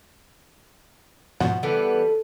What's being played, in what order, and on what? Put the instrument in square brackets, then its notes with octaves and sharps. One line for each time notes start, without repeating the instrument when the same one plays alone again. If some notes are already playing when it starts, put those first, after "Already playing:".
[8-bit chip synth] G#2 B2 F3 [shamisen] F#4
[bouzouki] E3 G3 B3 [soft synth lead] A4